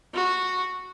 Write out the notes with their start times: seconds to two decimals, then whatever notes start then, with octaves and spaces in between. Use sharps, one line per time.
0.14 F#4